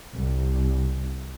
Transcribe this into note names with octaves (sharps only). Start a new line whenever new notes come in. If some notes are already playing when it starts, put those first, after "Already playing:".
C2